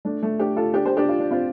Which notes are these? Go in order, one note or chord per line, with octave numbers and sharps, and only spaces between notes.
A3 D4
A3
D4 G4
F4 A4
D4 G4
G4 C5
D4 G4
F4
D4
C4 F4